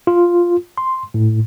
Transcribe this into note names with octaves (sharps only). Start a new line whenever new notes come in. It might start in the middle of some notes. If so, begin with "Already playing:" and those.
F4
C6
A2